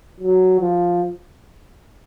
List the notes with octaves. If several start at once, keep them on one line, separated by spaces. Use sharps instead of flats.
F#3
F3